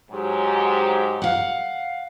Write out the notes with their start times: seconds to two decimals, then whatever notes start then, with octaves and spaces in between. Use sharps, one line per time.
0.11 G#2 F#3 G4
1.22 F5 F#5